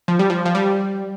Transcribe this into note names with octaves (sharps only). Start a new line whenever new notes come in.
F3
G3
F3
F3
G3